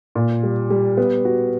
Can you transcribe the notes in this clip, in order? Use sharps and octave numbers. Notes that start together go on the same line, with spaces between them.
A#2
G3
G3
B3
F#4